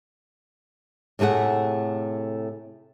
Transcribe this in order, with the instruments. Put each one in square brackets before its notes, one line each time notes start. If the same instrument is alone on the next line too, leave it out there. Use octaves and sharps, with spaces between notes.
[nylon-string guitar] A2 C3 A3 G#4 F#5